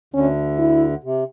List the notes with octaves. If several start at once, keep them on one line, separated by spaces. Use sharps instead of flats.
D2 D3 C#4
E4
C3